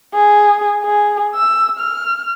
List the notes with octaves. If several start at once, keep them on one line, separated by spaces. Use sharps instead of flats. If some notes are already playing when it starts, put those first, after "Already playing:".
G#4
G#4
E6
F6